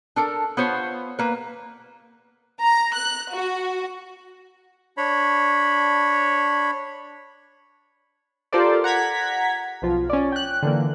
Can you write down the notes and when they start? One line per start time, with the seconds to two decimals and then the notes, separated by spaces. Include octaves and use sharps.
0.16 D4 A4 A#4
0.57 B3 F4 C5 C#5
1.19 A#3 B4
2.62 A#5
2.94 F#6
3.33 F#4
4.97 D4 C#5 B5
8.53 F4 G4 A4 A#4 C5 D5
8.84 F#5 A#5 G#6 B6
9.82 B1 F3 F4
10.10 C#4 D5
10.32 G5 F#6
10.63 D3 E3 A#3